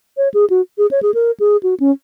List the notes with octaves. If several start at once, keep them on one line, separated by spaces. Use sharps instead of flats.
C#5
G#4
F#4
G#4
C#5
G#4
A#4
G#4
F#4
C#4